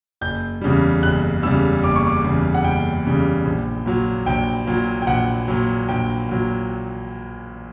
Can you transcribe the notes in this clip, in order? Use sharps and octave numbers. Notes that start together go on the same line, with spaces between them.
F#1 G6
E2 C#3 G3
F#1 F#6
E2 C#3 G3 E6
F#1 D6
C#6
D6
E2 C#3 G3
F#5
F#1 G5
E2 C#3 G3
A#1
A#2 F#3
A#1 G5
A#2 F#3
G5
A#1 F#5
A#2 F#3
A#1 G5
A#2 F#3